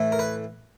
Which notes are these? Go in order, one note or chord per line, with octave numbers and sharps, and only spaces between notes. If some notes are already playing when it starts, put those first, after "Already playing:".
Already playing: A2 E3 A3
A#4
B4